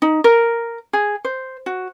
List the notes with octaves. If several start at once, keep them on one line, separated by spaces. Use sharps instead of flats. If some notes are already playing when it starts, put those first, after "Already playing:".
D#4
A#4
G#4
C5
F#4